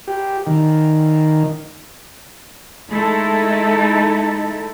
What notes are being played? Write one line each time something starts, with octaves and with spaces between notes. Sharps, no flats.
G4
D#3
G#3 A3 D#4 E4 A4